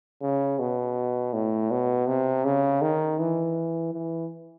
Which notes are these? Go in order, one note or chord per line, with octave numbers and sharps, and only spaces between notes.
C#3
B2
A2
B2
C3
C#3
D#3
E3
E3